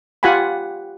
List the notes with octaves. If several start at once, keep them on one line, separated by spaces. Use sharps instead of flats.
F4 G4 F#5 G#5 B5